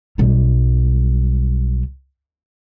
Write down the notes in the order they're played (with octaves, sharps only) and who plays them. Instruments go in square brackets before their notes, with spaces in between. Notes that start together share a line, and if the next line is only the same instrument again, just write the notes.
[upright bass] B1 G3